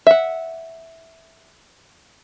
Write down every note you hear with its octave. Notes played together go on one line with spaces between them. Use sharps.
E5 F#5